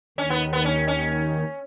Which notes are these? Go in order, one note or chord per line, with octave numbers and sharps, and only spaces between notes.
D#2 D#3 C#4
B3
B3
C#4
C#4